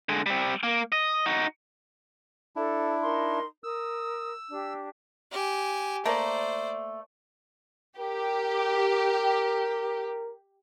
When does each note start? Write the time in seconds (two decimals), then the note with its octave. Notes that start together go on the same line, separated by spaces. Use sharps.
0.09 D3 G#3
0.26 G3 C4
0.63 A#3
0.92 D#5
1.26 D#4 F#4
2.56 D4 E4 A4
3.03 D#4 A#4 C6
3.64 A#4 D#6 E6
4.50 D4 G4
5.32 G4 G#5
6.06 A3 A#3 C5 D5
7.99 G4 A#4